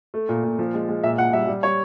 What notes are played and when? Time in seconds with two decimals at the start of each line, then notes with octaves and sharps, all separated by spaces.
0.14 A3
0.29 A#2
0.44 A#2
0.59 F3
0.74 G#3
0.89 G#3
1.04 A#2 E5
1.18 A#2 F#5
1.33 G3 E5
1.48 G3
1.63 G3 C#5